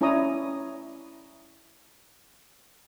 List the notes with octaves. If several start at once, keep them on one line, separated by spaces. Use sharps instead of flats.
C#4 E4 C#5 D5 A#5 D#6